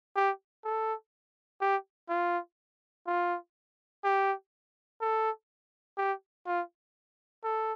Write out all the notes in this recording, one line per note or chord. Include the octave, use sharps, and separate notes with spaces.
G4
A4
G4
F4
F4
G4
A4
G4
F4
A4